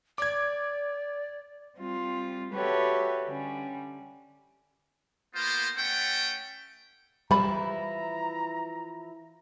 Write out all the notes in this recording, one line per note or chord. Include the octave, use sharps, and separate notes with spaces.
D5 D6 G#6
G3 C4 F4
F#4 G4 A4 B4 C#5 E5
D3 G3 C#4
A#3 B3 F4 C5
A3 C#4 F#5 G5
E3 F3 G3 E4 D5 A#5 B5